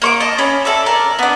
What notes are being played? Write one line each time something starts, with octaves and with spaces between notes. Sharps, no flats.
A#3 C#6 D6
D#5 A5
C#4 B5
A4 D5 E5
A#4 D5
B3 D4